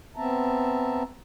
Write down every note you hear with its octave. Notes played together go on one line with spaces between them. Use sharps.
B3 C4 E5 A5 A#5